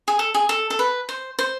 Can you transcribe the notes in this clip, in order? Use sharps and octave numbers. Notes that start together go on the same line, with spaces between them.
G#4
A4
G#4
A4
A4
B4
C5
C5